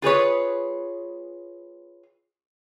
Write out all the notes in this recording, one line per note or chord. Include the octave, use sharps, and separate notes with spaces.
F4 G#4 B4 C#5